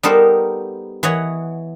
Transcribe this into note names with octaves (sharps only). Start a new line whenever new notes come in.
G3 B3 D#4 A4 A#4 C5
E3 C#5 D#5 F#5